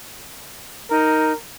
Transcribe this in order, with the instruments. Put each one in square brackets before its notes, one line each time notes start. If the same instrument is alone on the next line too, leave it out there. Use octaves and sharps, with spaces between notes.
[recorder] D#4 [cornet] A#4